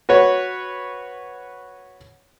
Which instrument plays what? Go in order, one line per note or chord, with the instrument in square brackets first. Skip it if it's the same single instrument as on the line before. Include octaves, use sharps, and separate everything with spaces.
[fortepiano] F#4 B4 C#5